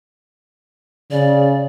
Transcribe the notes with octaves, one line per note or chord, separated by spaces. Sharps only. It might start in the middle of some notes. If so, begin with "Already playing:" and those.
C#3 D5